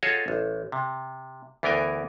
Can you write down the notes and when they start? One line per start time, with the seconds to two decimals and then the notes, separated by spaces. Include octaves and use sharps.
0.03 F4 F#4 G#4 A4 C#5 D#5
0.28 A1
0.72 C3
1.63 D2 E3 B3 A#4 G5 G#5